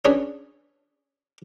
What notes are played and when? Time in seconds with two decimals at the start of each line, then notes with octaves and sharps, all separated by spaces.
0.05 C#4 D4 G#4 B4 C#5